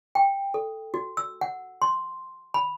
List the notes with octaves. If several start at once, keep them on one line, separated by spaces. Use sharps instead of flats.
G5
A4
F#4
E6
F#5
C6
B5